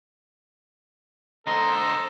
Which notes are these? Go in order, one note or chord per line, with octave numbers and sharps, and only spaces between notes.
D3 A4 C5 D#5 A#5 D#6 A#6